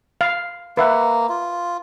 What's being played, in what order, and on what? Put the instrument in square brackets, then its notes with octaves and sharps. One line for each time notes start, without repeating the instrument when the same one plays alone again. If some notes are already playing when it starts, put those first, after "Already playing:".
[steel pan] F5
[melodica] A#3 [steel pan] B4 E5 F#5
[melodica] F4